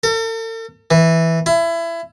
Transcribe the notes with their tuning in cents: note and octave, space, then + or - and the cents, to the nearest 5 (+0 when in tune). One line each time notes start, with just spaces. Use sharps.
A4 +45
E3 -5
E4 +25